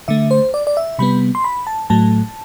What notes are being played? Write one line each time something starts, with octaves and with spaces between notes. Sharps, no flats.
D3 A3 E5
C5
D5
D5
E5
C3 G3 B3 B5
C6
B5
A5
A2 F#3 A3 A5